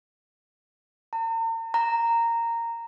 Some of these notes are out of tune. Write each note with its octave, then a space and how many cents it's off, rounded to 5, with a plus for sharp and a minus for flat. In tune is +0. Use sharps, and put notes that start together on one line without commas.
A#5 -45
A#5 -10